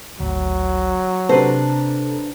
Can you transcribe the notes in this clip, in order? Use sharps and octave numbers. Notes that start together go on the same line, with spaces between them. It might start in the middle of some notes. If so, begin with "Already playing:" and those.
G#1 D2 F#3
C3 D4 A4 B4 C5 A#5